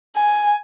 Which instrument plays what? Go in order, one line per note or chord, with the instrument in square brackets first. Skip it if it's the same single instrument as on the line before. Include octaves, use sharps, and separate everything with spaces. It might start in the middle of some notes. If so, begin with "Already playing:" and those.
[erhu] G#5